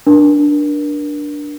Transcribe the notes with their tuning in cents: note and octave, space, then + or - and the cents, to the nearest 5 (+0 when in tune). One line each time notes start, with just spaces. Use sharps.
D4 +0 A#4 +35